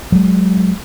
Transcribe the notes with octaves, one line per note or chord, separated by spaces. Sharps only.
F#3 G#3